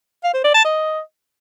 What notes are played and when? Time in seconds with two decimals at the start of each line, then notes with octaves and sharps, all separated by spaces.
0.24 F5
0.34 C5
0.44 D5
0.54 A5
0.65 D#5